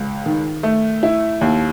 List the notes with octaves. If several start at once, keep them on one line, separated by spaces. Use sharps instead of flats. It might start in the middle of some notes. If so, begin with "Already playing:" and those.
Already playing: C#2
D#3
A3
E4
D#2